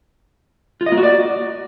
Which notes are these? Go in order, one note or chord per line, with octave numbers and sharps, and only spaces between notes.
F4
D#5
A#3
F#4
D5